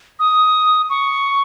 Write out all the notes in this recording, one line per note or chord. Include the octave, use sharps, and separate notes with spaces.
D#6
C#6